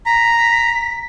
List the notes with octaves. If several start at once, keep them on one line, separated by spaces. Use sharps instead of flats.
A#5 B6